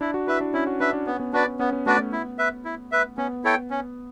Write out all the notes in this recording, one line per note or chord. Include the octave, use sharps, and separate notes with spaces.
D4 E4
F#4
E4 B4 E5
D4
C#4 E4
F#4
D4 B4 E5
D4
B3 C#4
B3
B3 D4 F#4 B4 D5
C#4
B3 C#4
B3
A3 D4 F#4 B4 D5
B3
E4
B4 E5
E4
B4 E5
B3 C#4
E4 A4 C#5 G5
C#4